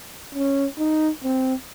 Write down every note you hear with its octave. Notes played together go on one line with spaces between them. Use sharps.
C#4
D#4
C4